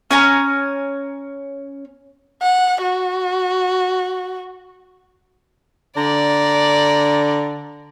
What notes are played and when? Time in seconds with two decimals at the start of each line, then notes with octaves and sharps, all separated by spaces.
0.11 C#4 G#5 A#5
2.42 F#5
2.82 F#4
5.97 D3 D5 A#5